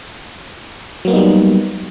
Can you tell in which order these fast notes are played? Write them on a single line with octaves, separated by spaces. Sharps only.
F#3 A#3 B3 D#4 G3